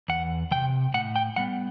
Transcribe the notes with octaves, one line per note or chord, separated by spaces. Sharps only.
E2 F#5
C3 E3 G5
A2 F#5
G5
G3 B3 F#5